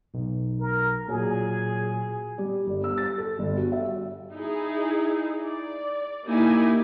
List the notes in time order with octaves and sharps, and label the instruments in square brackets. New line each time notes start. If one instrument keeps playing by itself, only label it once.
[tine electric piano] B1
[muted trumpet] A#4
[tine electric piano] A#2 F#3 [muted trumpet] G#4
[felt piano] G3
G1
E6
A6
A4
G1
F#4
E5
[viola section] D#4 E4 G#4
D5
A#3 D#4 E4 G4 G#5